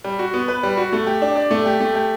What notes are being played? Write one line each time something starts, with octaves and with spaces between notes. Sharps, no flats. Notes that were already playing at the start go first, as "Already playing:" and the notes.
G3
F#4
B3
B4
G3
F#4
A3
G4
D4
D5
A3
G4
A3
G4